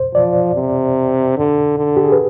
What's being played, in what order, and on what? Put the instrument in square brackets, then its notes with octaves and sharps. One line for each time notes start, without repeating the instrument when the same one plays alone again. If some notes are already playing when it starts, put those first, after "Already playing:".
Already playing: [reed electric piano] C5
[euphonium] F3 [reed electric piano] D5
[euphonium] C3
D3
D3
[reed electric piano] G4
G#4
B4